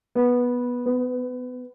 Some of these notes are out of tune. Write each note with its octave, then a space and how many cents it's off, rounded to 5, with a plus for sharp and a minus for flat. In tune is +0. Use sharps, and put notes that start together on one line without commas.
B3 -10
B3 +25